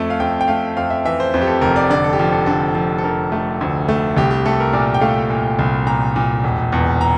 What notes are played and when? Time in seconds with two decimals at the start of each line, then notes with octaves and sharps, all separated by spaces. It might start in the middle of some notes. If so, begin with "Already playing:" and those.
Already playing: F2 A3
0.10 F5
0.20 F2 G5
0.41 G5
0.48 A3 F5
0.77 F2 F5
0.90 E5
1.05 E3 E5
1.20 C5
1.34 F2 C5
1.41 G4
1.47 A4
1.61 F1 A#4
1.76 D5
1.90 D3 D5
2.04 A4
2.13 G4
2.18 F3 A4
2.32 A4
2.46 D3 A4
2.75 F3
2.98 A4
3.04 D3 A#4
3.32 A3
3.61 D2
3.89 A3
4.17 C2 G4
4.31 G4
4.46 A3 A4
4.60 A#4
4.73 A#2 D5
4.94 G5
5.01 A3 F5
5.30 A#2
5.59 C2
5.87 A#2 A#5
6.16 A#2
6.44 E1
6.72 E2
7.01 A#5